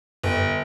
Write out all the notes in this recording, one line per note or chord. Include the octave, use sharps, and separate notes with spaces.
G1